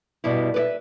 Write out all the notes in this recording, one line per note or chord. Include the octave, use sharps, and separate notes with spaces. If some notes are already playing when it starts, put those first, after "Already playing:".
G2 B2 G3 E4
B4 D5 E5